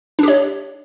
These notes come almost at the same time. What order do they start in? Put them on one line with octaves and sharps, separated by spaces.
D4 G4 C#5